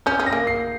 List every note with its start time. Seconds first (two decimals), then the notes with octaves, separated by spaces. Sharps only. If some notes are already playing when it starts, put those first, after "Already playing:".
0.06 C#4 G6
0.20 C#4
0.26 A#6
0.33 A#3
0.47 C7